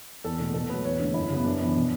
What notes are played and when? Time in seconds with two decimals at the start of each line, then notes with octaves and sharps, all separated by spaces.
0.24 E2 A4
0.40 B2 A3
0.54 B2 A4
0.69 F#3 A3 B4
0.84 E2 C#5
1.00 D3 A3
1.14 F#2 E4
1.30 C#3 G3 B3
1.44 F#2 D4
1.60 E3 B3
1.75 B2